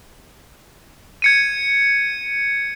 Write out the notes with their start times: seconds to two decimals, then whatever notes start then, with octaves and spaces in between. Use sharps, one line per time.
1.22 G#6 C#7 D#7